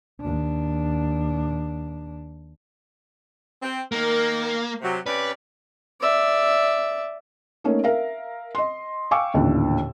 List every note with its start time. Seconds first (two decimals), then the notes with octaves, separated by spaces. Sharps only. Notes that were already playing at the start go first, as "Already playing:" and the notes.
0.21 D#2 D4
3.62 C4
3.92 D#3 A#3 A#4
4.82 C3 F#3
5.06 C3 C#4 B4 D5
6.01 D5 E5
7.64 A3 A#3 C#4 D#4
7.84 A#4 E5 F5
8.55 D#5 C6
9.11 F5 G5 G#5 C#6 D6 E6
9.34 A1 D#2 A#2 D3